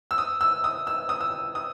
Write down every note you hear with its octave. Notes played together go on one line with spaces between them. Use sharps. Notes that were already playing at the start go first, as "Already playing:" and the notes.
E6
D#6
E6
D#6
E6
D#6
E6
D#6